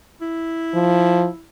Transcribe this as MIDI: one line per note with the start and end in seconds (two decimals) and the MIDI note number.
0.21 1.44 64
0.75 1.27 53